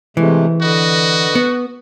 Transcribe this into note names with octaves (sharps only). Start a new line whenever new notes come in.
C3 E3 G#3 A3
D3 F#4 B4 D#5
B3